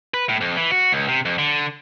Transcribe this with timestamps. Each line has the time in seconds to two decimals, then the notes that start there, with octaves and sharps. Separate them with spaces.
0.14 B4
0.29 A2
0.41 F2
0.57 E3
0.71 F#4
0.92 C#2
1.08 C3
1.25 F2
1.39 D3